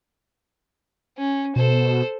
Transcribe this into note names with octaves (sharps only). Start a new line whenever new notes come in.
C#4
B2 A4 C5